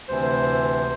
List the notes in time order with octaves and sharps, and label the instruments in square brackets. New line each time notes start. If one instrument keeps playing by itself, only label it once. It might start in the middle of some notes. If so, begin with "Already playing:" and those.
[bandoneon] D2 C3 E3 C5